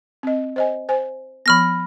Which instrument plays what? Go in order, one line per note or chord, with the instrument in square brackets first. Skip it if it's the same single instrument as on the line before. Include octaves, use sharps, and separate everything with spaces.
[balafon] C4 D#5
C5 D#5 G#5
C5 G#5
[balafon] F3 B3 [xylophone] B5 F6 A#6